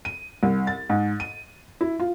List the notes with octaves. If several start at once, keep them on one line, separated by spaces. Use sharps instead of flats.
D#7
C2
A6
G#2
D#7
E4
F4